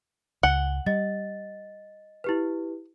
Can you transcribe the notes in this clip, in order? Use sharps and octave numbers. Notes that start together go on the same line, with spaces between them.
C#2 F#5 G#5 G7
G3 D#5 A6
E4 G4 B4